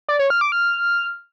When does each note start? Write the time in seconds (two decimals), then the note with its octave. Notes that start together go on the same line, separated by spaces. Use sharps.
0.08 D5
0.19 C#5
0.30 F6
0.41 D6
0.52 F6